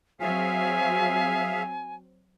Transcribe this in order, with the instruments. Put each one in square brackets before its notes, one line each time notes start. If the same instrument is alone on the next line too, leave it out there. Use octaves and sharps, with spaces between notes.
[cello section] F#3 C4 [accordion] G#4 E5 F5 [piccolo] G#5